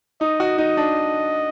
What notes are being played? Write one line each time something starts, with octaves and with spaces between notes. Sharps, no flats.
D#4 D#5
F#4
D#4 D#5
D4